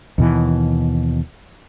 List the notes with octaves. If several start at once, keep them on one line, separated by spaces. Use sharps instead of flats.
D#2 B2 E3